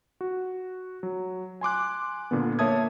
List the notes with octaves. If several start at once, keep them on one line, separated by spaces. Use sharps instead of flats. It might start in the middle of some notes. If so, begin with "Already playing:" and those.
F#4
F#3
G#5 C6 D6 F#6
A#2 D3 B3
A#3 C#5 E5 A5 D#6 G#6